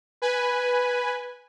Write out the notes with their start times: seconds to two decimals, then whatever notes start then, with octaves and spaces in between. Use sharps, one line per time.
0.22 B4 G#5